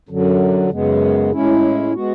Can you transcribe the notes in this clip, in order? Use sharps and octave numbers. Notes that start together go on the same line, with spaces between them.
F#2 D3 F#3
F#2 C#3 G#3 B3
A2 G#3 C#4 E4
G#3 B3 F#4